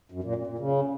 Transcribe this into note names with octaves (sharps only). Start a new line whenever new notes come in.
F#2
A#2
A#2
A#2
C#3